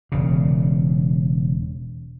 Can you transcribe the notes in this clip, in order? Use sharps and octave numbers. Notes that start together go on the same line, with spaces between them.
E1 C#3